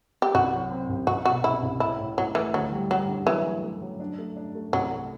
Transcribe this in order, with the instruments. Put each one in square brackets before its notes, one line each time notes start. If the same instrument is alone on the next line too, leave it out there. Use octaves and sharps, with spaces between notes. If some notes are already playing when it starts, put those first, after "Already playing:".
[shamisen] G4
[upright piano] C2 [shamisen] F#4
[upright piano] F#3
C4
C2
[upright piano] C2 [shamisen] F#4
[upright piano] B2 [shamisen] F#4
[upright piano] C2 [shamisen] E4
[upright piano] C2
[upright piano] A2 [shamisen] E4
[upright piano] A2
[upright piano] A2 [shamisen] F#3
[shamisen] E3 [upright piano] A3
[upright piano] D2 [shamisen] F#3
[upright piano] G3
[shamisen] F#3 [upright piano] G3
[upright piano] D3
[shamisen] E3 [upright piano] F#3
[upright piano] A3
A3
F#3
D4
A3
D4
A3
[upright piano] C2 [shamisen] F#3
[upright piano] A3